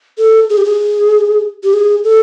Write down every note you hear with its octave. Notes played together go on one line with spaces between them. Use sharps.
A4
G#4
G4
G#4
G4
G#4
A4